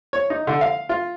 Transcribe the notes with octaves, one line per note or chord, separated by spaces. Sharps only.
C#5
D#4
D3
F5
F4